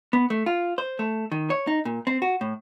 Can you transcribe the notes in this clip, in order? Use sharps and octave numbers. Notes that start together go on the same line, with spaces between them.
B3
A3
F4
C5
A3
D#3
C#5
D#4
A#2
C4
F#4
A2